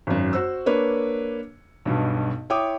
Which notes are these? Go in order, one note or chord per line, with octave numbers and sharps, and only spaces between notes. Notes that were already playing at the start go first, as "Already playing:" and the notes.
G#1 F#2
F#4 C5 E6
A#3 D4 B4 C#5
B1 G2 B2
E4 C#5 G5 D6 D#6